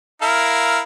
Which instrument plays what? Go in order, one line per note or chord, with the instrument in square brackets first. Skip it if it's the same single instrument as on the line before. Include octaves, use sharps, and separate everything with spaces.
[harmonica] E4 A#4 F5